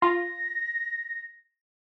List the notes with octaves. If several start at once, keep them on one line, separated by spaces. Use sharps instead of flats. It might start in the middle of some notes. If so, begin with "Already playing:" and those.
F4 A#6